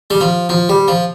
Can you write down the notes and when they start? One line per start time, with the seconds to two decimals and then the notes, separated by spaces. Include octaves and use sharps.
0.10 G3
0.21 F3
0.49 F3
0.69 G3
0.88 F3